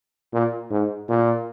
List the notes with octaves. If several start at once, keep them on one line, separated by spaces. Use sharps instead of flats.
A#2
G#2
A#2